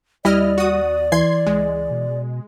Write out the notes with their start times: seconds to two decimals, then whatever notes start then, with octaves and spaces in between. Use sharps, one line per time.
0.25 D#2 G3 E4 D5 D#5 F6
0.58 F#4 D#6
1.12 E3 C6 G#6 C7
1.46 C#2 G#3
1.91 B2